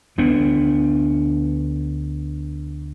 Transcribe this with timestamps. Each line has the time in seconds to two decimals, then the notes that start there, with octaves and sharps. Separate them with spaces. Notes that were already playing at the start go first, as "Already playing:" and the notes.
0.18 D2 B3 D4